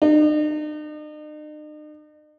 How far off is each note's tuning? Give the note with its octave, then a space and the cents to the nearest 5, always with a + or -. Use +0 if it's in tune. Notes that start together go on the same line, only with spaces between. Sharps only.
D#4 -45